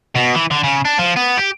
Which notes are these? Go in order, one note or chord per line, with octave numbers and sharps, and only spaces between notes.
B2
E3
D3
C#3
D4
F3
B3
G4